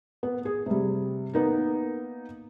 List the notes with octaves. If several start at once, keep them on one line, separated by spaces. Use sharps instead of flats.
B3
G#4
C3 G3
A#3 B3 D#4 A#4